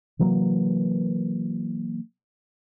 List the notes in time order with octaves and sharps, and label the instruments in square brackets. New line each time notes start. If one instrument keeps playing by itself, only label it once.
[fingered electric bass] C3 E3 F#3 A#3